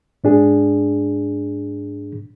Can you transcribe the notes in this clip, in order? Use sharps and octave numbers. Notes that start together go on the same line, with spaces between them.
G#2 D4 G#4